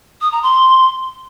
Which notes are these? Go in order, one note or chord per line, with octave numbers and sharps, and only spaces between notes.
D#6
A#5
C6